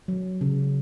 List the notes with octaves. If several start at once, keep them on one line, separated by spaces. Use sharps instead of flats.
F#3
C#3